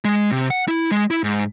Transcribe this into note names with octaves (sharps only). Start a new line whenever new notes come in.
G#3
C3
F#5
E4
G#3
E4
G#2